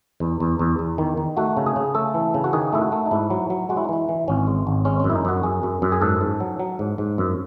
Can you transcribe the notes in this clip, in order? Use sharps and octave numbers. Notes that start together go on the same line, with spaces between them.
E2
E2
E2
E2
D#3
D#3
A3 F#4
C#3
G#4
C#3
A3 A4
E3
C#3
F#4
D#3 G#4
A3 E4
F#4
A3
D#4
G#2 E4
F#3
F#3
G#3 F#4
E4
D#4
E3 E4
E3
G#1 C#4
G#3
G#1
G#3 C#4
F#2 C#4
E4
D#4
F#2 F#4
F#2 G#4
F#2
F#2
G#4
G#2 A4
G#2
F#3
F#3
G#2
G#2
F#2